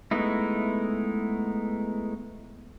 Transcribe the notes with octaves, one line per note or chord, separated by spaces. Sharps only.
G#3 A3 B3 D#4 E4